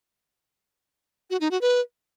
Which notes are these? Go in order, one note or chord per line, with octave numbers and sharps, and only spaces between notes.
F#4
D#4
F#4
B4